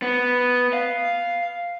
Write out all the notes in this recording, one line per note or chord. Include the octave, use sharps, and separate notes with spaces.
B3
F5